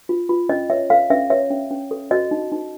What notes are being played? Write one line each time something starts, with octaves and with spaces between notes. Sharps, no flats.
F4
F4
C#4 D#5
C#5 E5
A4 F5
C#4 E5
C#5 E5
C#4
C#4
A4
F#4 D#5
D#4
D#4